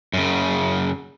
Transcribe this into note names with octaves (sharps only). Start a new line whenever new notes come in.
F#2 C#3